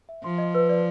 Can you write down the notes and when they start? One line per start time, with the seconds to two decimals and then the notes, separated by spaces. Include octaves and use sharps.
0.09 E5
0.24 F3 C6
0.38 D#5
0.55 B4
0.69 D5